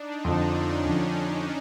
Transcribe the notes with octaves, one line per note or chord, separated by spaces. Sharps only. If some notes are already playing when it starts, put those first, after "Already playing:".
Already playing: D4 D#4
F2 D3 F3 D4
C#4
F2 D3 F3